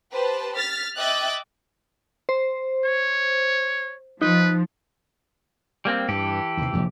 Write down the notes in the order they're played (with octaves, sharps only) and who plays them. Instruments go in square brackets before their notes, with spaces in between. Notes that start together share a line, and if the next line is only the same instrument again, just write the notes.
[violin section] G4 B4 C5 A5
F6 A6 B6
D#5 E5 G5 D6 F#6 A6
[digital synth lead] C5
[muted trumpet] C#5
[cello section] F3 [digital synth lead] D#4 [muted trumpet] B4
[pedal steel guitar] G3 A#3 C4
[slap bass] G2 [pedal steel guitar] E3 G4 A4
[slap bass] D#2 C3
F1 A#1 F2